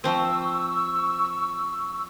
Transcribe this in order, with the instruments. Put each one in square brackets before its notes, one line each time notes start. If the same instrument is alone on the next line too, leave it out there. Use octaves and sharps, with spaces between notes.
[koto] F3 C4 [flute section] C#6 E6